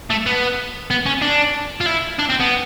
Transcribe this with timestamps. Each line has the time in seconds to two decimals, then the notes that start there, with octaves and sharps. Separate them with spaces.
0.10 A3
0.26 B3
0.91 B3
1.06 C#4
1.22 D4
1.81 F4
1.86 E4
2.19 D4
2.29 C4
2.40 B3